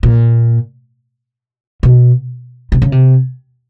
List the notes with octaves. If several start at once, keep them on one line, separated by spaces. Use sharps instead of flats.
A#2
B2
C3
C#3
C3